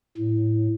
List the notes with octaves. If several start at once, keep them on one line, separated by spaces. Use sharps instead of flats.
A2